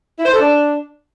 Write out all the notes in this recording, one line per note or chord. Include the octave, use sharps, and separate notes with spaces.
E4
C5
A4
D4